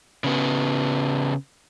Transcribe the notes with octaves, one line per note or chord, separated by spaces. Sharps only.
C#3 B3